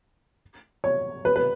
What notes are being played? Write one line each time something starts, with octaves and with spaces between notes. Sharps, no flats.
C#5
B4
B4